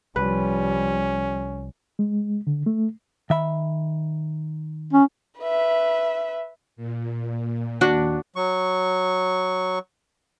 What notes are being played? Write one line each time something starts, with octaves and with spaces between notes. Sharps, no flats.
C2 F3 G3 C#4 B4
G#3
D3
A3
D#3 E5 B5
C#4
B4 E5
A#2
D#2 D4 F#4
F#3 C#6